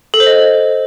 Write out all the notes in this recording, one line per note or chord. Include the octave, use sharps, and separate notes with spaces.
A4
C5
D#5